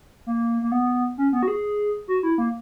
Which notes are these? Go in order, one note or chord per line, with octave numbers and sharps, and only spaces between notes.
A#3
A#3
B3
C#4
B3
F#4
G#4
F#4
E4
A#3